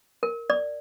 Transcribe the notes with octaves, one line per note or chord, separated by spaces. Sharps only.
A#4
D5